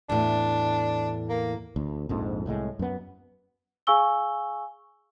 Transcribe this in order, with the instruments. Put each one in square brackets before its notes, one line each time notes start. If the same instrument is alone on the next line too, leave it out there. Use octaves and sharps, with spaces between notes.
[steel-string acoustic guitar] E2 A2 [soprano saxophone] D4
[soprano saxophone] A#3
[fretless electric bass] D2
A#1 F2 G#2
C2 A2 C#3 G#3
F#2 B3
[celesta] G#4 F5 G#5 C#6 E6 G7